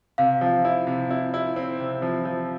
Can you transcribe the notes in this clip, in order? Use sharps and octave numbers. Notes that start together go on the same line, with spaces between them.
C3 F5
F3
E4
C3
E4
E4
C4
C3
F3
F3